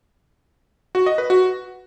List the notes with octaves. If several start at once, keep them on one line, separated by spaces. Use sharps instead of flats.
F#4
D#5
B4
F#4